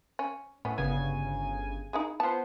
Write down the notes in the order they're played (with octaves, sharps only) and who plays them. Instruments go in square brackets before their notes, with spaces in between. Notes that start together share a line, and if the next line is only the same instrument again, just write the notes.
[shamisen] C#4
[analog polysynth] A2 [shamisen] B3 C#4
[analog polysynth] G1 C#3 G#5 [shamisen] B3
[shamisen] D#4 E4 G#4
[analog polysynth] B3 C5 [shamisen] F4 A5